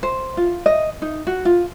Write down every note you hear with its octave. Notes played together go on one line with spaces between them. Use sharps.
C5
F4
D#5
D#4
F#4
F4